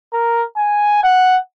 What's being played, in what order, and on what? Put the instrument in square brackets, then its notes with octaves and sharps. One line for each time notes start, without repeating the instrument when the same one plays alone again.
[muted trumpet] A#4
G#5
F#5